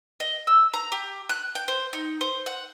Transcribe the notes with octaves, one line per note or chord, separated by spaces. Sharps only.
D#5
E6
A#5
G4
F#6
G5
C5
D#4
C5
F#5